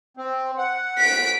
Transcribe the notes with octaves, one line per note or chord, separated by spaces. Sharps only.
C4
F#5
B6 D7